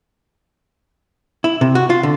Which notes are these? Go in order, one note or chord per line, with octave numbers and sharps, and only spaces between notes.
E4
C3
F#4
F4
D3